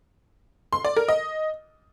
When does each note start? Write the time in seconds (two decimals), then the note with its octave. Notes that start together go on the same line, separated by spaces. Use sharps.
0.73 C6
0.85 D5
0.97 A#4
1.08 D#5